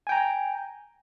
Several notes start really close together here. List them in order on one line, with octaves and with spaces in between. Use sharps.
G#5 G5 A#5